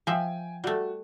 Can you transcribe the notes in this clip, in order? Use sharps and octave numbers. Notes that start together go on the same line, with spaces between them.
F3 E5 G5 G#5
G3 A3 F#4